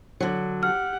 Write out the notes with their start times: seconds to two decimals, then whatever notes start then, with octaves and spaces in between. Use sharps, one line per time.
0.20 D3 F#3
0.63 G4 F#5 F6